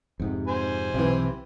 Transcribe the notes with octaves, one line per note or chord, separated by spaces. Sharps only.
F2 G#2 C3
C5 G#5
B1 C3 E3